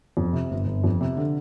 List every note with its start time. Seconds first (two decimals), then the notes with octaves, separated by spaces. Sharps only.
0.17 F2
0.33 C3
0.51 G1
0.67 G1
0.84 F2
1.01 C3
1.17 D3